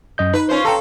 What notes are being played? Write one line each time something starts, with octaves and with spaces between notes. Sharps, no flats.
F#2 D#5 G6
D#4 B4
C#4 F4 C5
A4 G5 A#5 C6